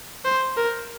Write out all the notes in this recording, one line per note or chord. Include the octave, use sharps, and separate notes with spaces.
C5
A#4